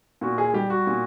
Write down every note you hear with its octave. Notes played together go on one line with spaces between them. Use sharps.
A#2 F#4
G#4
G3 G4
F#4
A#2